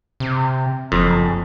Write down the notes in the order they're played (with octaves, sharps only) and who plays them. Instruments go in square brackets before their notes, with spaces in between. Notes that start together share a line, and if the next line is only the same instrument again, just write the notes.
[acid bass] C3
[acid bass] F#1 [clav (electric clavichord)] F2